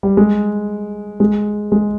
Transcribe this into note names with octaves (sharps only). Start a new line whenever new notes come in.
G3
G#3
G#3
G#3